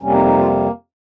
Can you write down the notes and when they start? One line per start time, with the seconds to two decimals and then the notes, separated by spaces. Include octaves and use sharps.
0.02 F2 C3 G3 A#3 C#4
0.13 D#4
0.25 D#4
0.37 F4